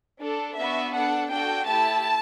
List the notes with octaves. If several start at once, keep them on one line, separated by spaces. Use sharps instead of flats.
D4 A4
B3 D4 F#4 E5
D4 A4 F#5
D4 F#4 A4 G5
A3 E4 G4 A5